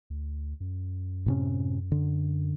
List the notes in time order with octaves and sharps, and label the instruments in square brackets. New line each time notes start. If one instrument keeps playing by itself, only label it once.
[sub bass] D2
F#2
[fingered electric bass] A2 C3 C#4
D3